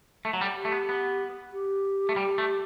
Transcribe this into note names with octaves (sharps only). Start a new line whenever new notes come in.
A3
F#3
G3
G4
A3
B3
B3
G4
A3
G3
A3